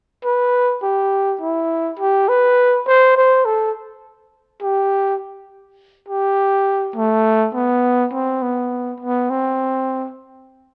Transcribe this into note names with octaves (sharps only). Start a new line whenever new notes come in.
B4
G4
E4
G4
B4
C5
C5
A4
G4
G4
A3
B3
C4
B3
B3
C4